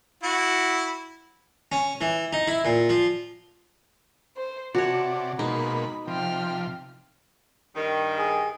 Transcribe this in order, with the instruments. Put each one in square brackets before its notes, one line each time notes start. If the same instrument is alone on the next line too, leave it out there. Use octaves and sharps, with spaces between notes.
[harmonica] E4 F#4
[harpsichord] C#4
E3
D#4
E4
A#2
F3
[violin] C5
[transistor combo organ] C3 D5 [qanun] F#4 C#5 [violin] A5
[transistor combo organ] B2 G#3 A#3 [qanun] D#4 [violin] B5
[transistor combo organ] C3 F3 [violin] G5 F6
[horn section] G2 D#3
[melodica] G#4